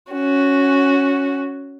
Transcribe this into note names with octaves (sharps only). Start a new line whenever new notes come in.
C#4 F#4